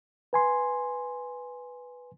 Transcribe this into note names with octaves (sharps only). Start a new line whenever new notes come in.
B4 G#5 C6